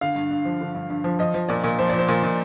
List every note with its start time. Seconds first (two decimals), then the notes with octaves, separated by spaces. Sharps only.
0.01 D3 F5
0.16 G2
0.31 G2
0.45 F3
0.61 D3
0.75 G2
0.90 G2
1.04 F3
1.19 F3 D#5
1.34 F3
1.49 A#2 D5
1.64 A#2
1.79 F3 C5
1.89 F3 D5
1.99 C5
2.08 A#2
2.23 A#2